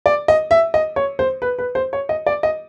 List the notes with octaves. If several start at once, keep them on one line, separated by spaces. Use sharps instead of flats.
D5
D#5
E5
D#5
C#5
C5
B4
B4
C5
C#5
D#5
D5
D#5